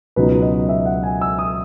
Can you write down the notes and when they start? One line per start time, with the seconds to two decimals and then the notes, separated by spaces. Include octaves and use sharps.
0.16 C#2 B2 F#3 B3 D#4 B4
0.42 D#5
0.69 E5
0.86 F#5
1.03 G#5
1.21 E6
1.39 D#6